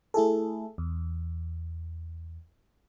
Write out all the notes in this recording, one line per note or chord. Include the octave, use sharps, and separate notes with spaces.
A3 E4 G#4 A4
E2